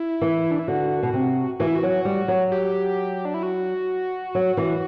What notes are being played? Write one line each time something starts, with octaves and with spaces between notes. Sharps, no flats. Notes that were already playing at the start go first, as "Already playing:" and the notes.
Already playing: E4
E3
D4
E4
D3 F#4
B2
C3
E3 F#4
E4
F#4
F#3
G3
F#3
G4
D4
E4
F#4
F#3
E3